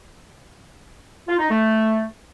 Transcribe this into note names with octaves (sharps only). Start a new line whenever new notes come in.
F4
D#4
A3